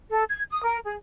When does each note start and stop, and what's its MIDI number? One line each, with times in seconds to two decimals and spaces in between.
0.11 0.24 69
0.30 0.43 92
0.50 0.63 87
0.63 0.78 70
0.85 0.95 68